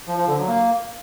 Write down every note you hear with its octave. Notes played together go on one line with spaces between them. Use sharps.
F3
F3
D3
F#3
A#3